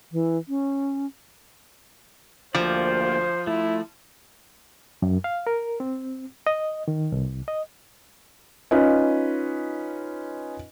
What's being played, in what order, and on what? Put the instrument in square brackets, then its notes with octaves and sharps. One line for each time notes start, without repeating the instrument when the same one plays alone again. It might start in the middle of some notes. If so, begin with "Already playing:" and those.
[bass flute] E3
C#4
[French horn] D2 [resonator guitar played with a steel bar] F3 [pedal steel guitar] A#3 G4 D5 [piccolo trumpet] C5
[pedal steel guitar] A3 [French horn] E4
[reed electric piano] F#2
F5
A#4
C4
D#5
D#3
C2
D#5
[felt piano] C#4 D#4 F4 B4 D#5